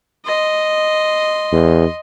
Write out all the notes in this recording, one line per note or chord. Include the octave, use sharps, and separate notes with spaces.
D#5 C6
E2